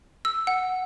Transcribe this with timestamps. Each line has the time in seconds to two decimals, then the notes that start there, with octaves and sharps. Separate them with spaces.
0.25 E6
0.47 F#5